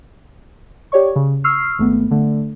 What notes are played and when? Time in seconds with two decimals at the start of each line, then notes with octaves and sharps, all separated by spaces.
0.92 G4 C#5 D5 C#6
1.16 C#3
1.44 C#6 E6 F6 C7
1.78 G#1 A3 B3
2.11 D3 A3